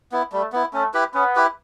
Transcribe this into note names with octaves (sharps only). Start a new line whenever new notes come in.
B3 E4
G3 A3
B3 E4
A3 C#4
E4 G4 B4
B3 C#4
E4 G4 B4